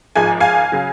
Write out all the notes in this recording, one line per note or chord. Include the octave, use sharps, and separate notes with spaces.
G#1 G#2 F3 G#3 G#5
F5 G#5
C#3 F#3